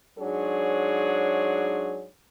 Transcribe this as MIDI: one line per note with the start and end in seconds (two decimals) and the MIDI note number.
0.19 2.06 44
0.19 2.06 54
0.19 2.06 62
0.19 2.06 68
0.19 2.06 73